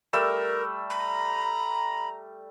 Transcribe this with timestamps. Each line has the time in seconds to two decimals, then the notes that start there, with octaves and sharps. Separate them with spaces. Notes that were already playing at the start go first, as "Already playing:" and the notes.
0.13 G3 A3 A#4 E6
0.90 A#5 B5